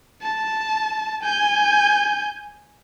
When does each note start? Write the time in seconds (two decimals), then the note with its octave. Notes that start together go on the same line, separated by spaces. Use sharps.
0.23 A5
1.22 G#5 G6